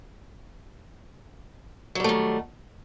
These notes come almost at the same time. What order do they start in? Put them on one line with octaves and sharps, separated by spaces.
F#3 G3 A3 D#3